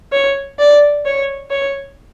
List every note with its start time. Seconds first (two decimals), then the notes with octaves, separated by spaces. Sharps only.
0.12 C#5
0.59 D5
1.06 C#5
1.51 C#5